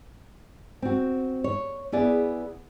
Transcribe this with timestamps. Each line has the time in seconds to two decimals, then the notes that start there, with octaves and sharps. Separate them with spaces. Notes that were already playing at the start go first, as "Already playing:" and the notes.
0.82 C4 F#4
1.44 C#5
1.92 B3 E4 G#4 D5